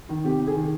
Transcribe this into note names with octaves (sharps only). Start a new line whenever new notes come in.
D#3
C3 G4
C3
G#4
D#3